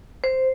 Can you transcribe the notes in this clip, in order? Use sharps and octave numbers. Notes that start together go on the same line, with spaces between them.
C5